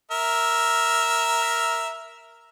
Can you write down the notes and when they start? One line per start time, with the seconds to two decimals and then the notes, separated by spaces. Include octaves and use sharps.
0.11 A#4 E5